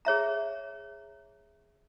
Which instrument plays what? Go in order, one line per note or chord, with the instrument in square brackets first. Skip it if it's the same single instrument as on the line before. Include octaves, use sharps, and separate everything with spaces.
[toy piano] G#4 C#5 E5 A#5